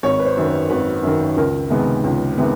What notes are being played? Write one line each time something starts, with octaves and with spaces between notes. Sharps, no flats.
G#1 C#5
B4
C5
F#2 D#3
B4
G#1 B4
F#2 D#3
C#2 A#4
C3 D#3 G#3 B3
C#2
C3 D#3 G#3 B3